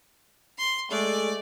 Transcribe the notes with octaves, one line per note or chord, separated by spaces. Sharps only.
C6
G#3 A3 D5